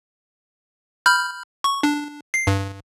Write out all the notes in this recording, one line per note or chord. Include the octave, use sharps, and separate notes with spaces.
B5 F6 G6
C#6
D4
C7
G2